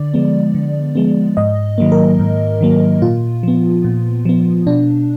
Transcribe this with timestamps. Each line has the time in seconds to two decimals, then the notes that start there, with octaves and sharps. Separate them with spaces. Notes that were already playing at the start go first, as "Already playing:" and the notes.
Already playing: D3 D5
0.14 F3 G#3 B3
0.55 D3
0.95 F3 G#3 B3
1.37 G#2 D#5
1.78 D#3 F#3 A#3
1.92 A#4
2.19 G#2
2.61 D#3 F#3 A#3
3.02 A#2 F4
3.43 F3 B3
3.84 A#2
4.25 F3 B3
4.66 B2 D4